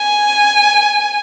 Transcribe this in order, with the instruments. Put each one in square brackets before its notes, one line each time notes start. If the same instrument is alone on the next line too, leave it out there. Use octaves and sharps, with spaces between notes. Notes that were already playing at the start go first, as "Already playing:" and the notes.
Already playing: [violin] G#5